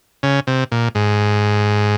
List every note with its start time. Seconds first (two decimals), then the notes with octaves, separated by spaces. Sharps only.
0.23 C#3
0.47 C3
0.72 A#2
0.95 G#2